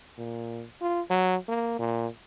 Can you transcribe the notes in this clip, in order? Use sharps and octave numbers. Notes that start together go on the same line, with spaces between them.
A#2
F4
F#3
A#3
A#2